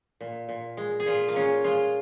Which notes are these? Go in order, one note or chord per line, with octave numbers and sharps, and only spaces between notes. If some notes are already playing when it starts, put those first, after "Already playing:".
A#2
A#2
G#3
G#4
A#2 F4
A#3
G#3 C#4
G#3 F4